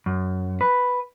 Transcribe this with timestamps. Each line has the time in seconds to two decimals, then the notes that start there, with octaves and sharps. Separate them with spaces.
0.06 F#2
0.61 B4